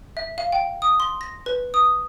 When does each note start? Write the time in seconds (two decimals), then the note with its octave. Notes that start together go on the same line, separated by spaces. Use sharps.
0.17 E5
0.38 F5
0.52 G5
0.82 D#6
1.00 C6
1.21 A#6
1.46 B4
1.74 D#6